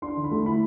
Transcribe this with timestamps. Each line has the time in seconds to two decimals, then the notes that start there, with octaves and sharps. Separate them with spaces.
0.02 D4 C6
0.17 D3
0.24 B5
0.31 A3
0.46 E4 B5